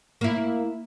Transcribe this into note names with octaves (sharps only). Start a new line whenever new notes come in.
A#3 E4